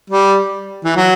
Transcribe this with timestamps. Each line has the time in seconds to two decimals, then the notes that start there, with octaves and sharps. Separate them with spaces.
0.10 G3
0.84 E3
0.96 F#3